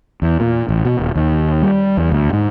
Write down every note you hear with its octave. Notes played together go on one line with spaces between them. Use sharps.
E2
A#2
A1
B2
D#1
D#2
G3
E2
D2
G#2